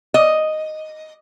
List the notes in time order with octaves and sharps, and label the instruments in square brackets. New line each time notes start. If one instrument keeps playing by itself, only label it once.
[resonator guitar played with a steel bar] D#5